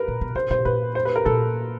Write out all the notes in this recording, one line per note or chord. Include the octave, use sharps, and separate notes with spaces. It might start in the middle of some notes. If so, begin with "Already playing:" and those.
Already playing: A#4 B4
A#2
B2
C3 C5
B2 C5
A#2 B4
C5
B4
A#4
A#2 A4